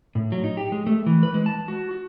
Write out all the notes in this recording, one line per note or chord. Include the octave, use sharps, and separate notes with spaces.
A2
F#3
D#4
G4
G#3
A3
E3
B4
G#3
A5
F#4
F#4